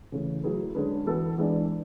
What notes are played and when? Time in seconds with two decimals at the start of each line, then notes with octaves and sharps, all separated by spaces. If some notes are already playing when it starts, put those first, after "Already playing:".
0.12 C#3 E3 A3 C#4
0.44 F#3 A3 E4 G#4 B4
0.75 D3 G#3 C#4 G#4 B4
1.06 E3 B3 F#4 A4
1.38 E3 G#3 D4